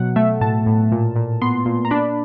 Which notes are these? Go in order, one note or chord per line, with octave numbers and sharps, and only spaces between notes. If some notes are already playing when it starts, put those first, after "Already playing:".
Already playing: B2 F#3 F#5
A3 E5
A2 A5
A2
A#2
A#2
B3 C6
A#2
A#5
D4 B5